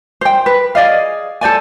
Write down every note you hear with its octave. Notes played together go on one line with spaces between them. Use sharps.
C5 G5
B4
G#4 D5 D#5 F5
A4 C5 D5 G#5